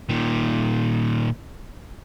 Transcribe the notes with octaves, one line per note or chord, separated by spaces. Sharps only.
A#2 D#3